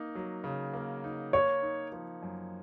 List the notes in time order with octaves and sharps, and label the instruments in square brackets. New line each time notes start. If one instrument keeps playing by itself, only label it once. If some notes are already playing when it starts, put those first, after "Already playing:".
Already playing: [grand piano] A#3 D#4
F#3
C#3
A#3
D#4
[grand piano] A#3 [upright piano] C#5
[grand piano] D#4
F3
F#2